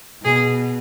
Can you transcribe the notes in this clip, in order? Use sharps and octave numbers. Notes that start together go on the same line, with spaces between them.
B2 G#4